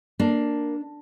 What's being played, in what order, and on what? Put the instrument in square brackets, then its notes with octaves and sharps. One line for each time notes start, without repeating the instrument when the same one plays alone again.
[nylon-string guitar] A#3 D4